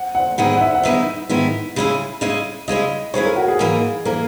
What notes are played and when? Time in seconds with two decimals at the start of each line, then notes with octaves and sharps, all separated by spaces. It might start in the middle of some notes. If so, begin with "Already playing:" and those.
Already playing: F#5
0.15 F#5
0.38 G#2 D#3 G#3 B3 E4 F#5
0.56 F#5
0.61 E5
0.75 F#5
0.83 G#2 D#3 G#3 B3 E4 E5
1.29 G#2 D#3 G#3 B3 E4
1.76 C#3 G#3 C#4 E4
2.21 C#3 G#3 C#4 E4
2.68 C#3 G#3 C#4 E4 D#5
3.14 C#3 G#3 C#4 E4 C#5
3.25 A#4
3.36 F#4
3.48 G#4
3.59 G#2 E3 A#3
4.05 E3 A#3 A#4